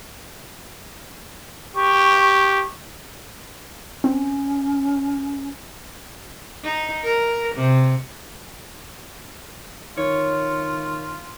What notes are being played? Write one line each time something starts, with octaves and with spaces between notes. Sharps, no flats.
G4 C#6
C4 C#4
D#4
A#4
C3
D#3 F4 C#5